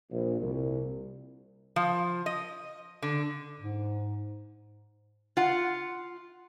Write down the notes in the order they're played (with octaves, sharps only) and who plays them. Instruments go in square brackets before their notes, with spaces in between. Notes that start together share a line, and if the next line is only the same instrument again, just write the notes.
[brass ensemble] A#1
C2
[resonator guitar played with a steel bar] F3
D#5
D3
[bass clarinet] G#2
[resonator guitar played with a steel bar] F4 F#5